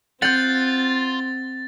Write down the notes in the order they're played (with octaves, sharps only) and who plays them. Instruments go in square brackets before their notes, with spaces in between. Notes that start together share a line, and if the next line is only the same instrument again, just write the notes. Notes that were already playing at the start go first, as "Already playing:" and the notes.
[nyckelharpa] C4 [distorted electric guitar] F4 [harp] F#5 G6 [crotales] A6